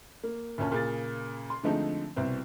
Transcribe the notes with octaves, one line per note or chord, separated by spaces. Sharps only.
A#3
D2 A#2 C#4 A5
A#2 C#3 G#4 A6
C6
D3 F3 G#3 A3 C4 D#4
C2 B2 C4